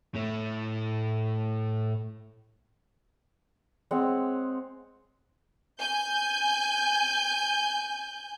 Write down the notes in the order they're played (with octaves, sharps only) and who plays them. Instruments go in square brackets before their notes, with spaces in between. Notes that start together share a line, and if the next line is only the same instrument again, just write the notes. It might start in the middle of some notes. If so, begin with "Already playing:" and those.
[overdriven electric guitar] A2 A3
[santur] G#3 C4 C#5 F#5
[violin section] G#5 G6